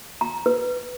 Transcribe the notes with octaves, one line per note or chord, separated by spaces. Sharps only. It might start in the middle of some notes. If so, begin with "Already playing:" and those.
A#5
B4